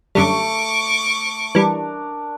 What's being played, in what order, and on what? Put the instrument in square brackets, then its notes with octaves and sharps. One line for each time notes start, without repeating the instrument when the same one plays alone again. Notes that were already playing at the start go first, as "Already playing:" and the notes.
[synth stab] F#2 D3 G3 [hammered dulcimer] A3 [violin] C#6 D6
[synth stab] E3 G3 [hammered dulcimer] D4 A#4